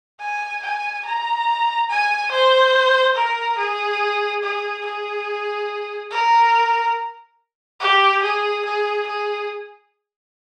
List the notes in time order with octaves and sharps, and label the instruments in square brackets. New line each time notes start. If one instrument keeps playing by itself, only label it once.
[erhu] G#5
G#5
A#5
G#5
C5
A#4
G#4
G#4
G#4
A#4
G4
G#4
G#4
G#4